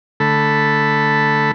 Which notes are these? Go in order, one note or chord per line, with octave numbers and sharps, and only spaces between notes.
D3 A3 A4 B5